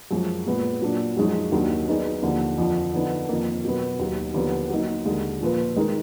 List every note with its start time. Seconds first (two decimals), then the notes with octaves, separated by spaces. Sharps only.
0.11 F#2 F3 G#3
0.46 A#2 G#3 B3
0.82 A#2 F#3 D4
1.17 F#2 F3 G#3 D#4 F#4
1.52 D#2 D#3 F#3 A#3 D4
1.88 F#3 B3 D#4 G#4 D5
2.22 D#2 D3 F3 A#3
2.58 F2 D3 F3
2.93 D3 F3 B3 D#4
3.29 F2 D#3 A#3
3.65 B2 F#3 B3
3.99 D#2 D#3 F#3
4.34 D#2 D3 F3 B3
4.70 F#3 A#3 D#4
5.05 D#2 D3 G#3
5.41 A#2 F3 A#3 F4 B4
5.76 D#3 G#3 D#4 A#4